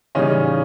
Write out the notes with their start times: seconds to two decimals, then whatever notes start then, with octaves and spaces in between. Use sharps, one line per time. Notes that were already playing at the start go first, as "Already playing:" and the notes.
0.15 C#3 E3 G3 C#4 D#4